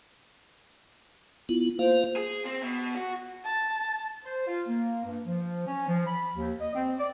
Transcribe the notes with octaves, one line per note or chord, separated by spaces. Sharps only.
B3 E4 F4
A#3 F4 C5 F5
G#4
C4
B2
F#4
A5
C5
F4
A#3
G2
F3
C#4
F3
B5
D#2
D#5
C4
D5